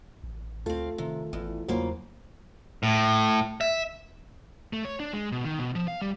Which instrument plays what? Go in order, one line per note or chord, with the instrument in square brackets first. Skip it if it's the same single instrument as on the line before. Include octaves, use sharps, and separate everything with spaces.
[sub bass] A1
[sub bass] D2 [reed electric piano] A3 F4 A4 [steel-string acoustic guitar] C4 F5
[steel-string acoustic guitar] C3 [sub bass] D#3
[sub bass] G#1 [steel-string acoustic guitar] E2
[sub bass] E2 [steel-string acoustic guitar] C#3 A#3 F4 [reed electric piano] F#3 C5
[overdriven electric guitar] A2
E5
[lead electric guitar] A3
C#5
D4
G#3
B2
D#3
B2
F3
F5
G3